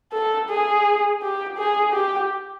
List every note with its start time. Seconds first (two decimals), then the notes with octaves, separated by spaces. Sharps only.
0.13 A4
0.50 G#4
1.22 G4
1.58 G#4
1.93 G4